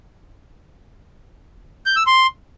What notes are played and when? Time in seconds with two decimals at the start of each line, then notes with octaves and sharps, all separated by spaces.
1.86 G6
1.96 E6
2.07 C6